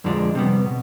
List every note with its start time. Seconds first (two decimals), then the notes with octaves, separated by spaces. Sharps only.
0.04 F2 D3 F3 G#3 D4
0.35 C3 G3 B3
0.66 B2